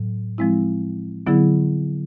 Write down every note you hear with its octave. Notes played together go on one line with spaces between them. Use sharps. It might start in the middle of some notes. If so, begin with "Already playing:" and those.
Already playing: A2 F#3
F3 G#3 C4 E4
D3 F#3 B3 E4 G#4